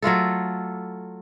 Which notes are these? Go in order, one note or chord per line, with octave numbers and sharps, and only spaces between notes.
F#3 A3 F4 A4